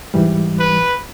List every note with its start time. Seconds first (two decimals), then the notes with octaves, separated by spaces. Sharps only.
0.14 G#2 E3 G3
0.60 B4